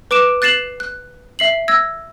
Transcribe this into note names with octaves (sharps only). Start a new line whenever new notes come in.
B4 D6 D7 E7
F#6 A6 C7 E7 F#7
F#6
E5 C7 F#7
E6 G#6 A#6